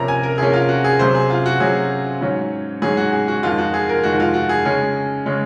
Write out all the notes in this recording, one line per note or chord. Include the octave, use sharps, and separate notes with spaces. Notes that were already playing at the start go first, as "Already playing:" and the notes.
Already playing: C3 F3 A#3 C#4 A#5
G#5
A#4
C3 F3 A#3 C#4 G#4
F4
F#4
G#4
C3 F#3 C#4 C5
G#4
F4
F#4
C3 F#3 C#4 G#4
G#2 F#3 C#4
G#2 F#3 C#4 G#4
F#4
G#4
F#4
F2 D#3 G#3 F4
F#4
G#4
A#4
F2 D#3 G#3 F#4
F4
F#4
G#4
C#3 G#3 C#4 G#4
C#3 G#3 C#4